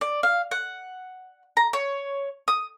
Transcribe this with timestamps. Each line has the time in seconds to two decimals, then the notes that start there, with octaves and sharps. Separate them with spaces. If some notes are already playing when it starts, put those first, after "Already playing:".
0.01 D5
0.23 F5
0.51 F#5
1.57 A#5
1.73 C#5
2.48 D#6